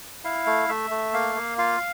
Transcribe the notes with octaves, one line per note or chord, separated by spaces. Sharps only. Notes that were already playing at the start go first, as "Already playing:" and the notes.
E4 F5
A3
A3 E5
A3
A#3 F5
A#3
F4 F5